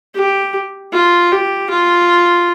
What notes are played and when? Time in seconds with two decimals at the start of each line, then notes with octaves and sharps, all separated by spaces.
0.15 G4
0.93 F4
1.32 G4
1.70 F4